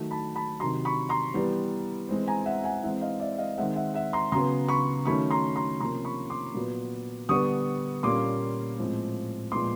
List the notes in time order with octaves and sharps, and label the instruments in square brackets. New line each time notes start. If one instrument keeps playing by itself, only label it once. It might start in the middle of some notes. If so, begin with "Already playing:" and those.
Already playing: [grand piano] D#3 F#3 A3
A5 B5
A5 B5
C3 D#3 F#3 A#5 C6
B5 C#6
A#5 C6
E3 G3 B3
E3 G#3 C4
G#5 A#5
E5 F#5
F#5 G#5
E3 G#3 C4 E5 F#5
D#5 F5
D5 E5
D#5 F5
D#3 G#3 C4 E5 F#5
E5 F#5
E5 F#5
A#5 C6
C#3 F#3 B3 A#5 C6
B5 C#6
D#3 F#3 A3 C#4 B5 C#6
A#5 C6
A#5 C6
C3 F3 A#3 C#4 A#5 C6
B5 C#6
C6 D6
A#2 F#3 B3
D3 G3 B3 C#6 D#6
A#2 G3 A#3 C#4 C6 D6
A2 F3 G#3 C4
A#2 F3 G#3 B3 C6 D6